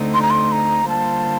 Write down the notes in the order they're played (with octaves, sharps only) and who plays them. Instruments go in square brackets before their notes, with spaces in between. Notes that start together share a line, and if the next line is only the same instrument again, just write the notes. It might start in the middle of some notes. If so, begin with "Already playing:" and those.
Already playing: [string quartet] D2 D3 A3 C4 D#4
[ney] C6
A#5
C6
A#5
[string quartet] D3 G3 A#3 F4 C5 [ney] A5